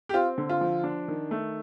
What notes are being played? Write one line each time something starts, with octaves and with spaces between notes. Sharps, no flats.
G4
C4 F4
D3
F4
F3
D4
D#3
A3